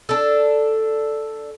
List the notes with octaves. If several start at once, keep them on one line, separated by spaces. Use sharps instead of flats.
D4 A4